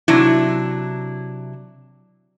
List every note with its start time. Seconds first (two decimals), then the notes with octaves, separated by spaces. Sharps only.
0.08 C3 F#3 D4 E4